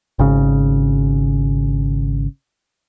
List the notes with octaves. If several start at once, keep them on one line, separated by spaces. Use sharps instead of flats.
G#1 C#3